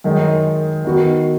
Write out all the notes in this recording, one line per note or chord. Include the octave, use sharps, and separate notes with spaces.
F#2 D#3 G#3 D#4
D#3 B3 D#4 F#4